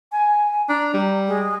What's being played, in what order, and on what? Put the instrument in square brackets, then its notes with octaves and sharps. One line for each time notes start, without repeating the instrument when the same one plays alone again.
[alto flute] G#5
[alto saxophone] D4 [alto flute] A#5
[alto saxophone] G3
[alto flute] G#3